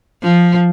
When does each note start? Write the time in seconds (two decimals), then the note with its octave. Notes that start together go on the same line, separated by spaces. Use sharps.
0.23 F3